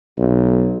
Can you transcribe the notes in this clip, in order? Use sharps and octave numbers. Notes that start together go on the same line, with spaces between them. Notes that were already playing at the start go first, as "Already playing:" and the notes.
B1